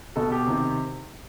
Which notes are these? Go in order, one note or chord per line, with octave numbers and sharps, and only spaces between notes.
B2 A4
G4
C3 D#3